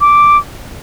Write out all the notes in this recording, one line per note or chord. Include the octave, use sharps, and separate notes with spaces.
D6